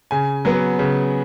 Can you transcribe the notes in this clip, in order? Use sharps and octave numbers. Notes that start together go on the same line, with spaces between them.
C#3 G#5
F#3 B3
C#3